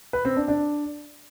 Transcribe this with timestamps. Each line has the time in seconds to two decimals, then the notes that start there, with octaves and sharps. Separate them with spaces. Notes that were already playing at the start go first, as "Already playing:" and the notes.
0.13 B4
0.25 C4
0.36 D4
0.48 D4